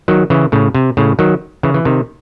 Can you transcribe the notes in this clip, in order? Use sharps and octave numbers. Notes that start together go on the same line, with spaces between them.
D#3 F#3
C#3 E3
A2 C#3
C3
A2 C#3
D#3 F#3
C#3 E3
E3
C3 D#3